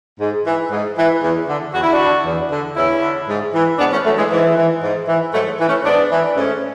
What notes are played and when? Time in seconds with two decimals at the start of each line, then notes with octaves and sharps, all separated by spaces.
0.20 G#2
0.45 E3
0.71 G#2
0.97 E3
1.22 E2
1.48 D3
1.73 E2 F#4
1.83 E4
1.92 D4 F#4
1.99 D3
2.25 E2
2.50 D3
2.76 E2 C#4 E4
3.01 D3
3.28 G#2
3.54 E3
3.79 G#2 B3 D4
3.92 A3 C#4
4.04 E3 F#3 A3
4.17 E3 G#3
4.31 G#2 E3
4.56 E3
4.82 G#2
5.07 E3
5.33 G#2 F#3 A3
5.59 E3
5.68 A3 C#4
5.85 G#2 B3 D4
6.10 E3
6.36 G#2 A3 C#4